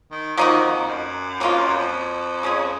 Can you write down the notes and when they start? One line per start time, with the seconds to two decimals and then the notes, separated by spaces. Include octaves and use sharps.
0.11 D#3
0.37 D#3 F3 A#3 D#4 F#4
0.63 F2
0.88 F#2
1.40 F2 F#3 A#3 C#4 F4
1.58 F#2
1.75 F2
2.43 G#3 C#4 F4 G#4